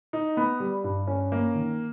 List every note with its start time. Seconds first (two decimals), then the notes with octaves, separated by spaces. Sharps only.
0.13 D#4
0.37 B3
0.60 G3
0.84 G2
1.07 C#4
1.32 A#3
1.55 D#3